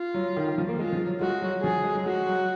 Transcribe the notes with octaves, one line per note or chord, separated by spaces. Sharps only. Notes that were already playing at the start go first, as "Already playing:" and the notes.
Already playing: F4
F#3
D#3
D#3
F3
A#3
G#3 F4
F3
F#3
G#3 F#4
F#3
F3 G#4
G#3
F#3
G#3 F#4
F#3